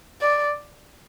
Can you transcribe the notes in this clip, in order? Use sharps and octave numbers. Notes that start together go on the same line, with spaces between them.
D5